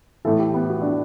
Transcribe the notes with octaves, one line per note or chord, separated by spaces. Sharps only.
A2 E3 A4
G4
B3
F#4
D4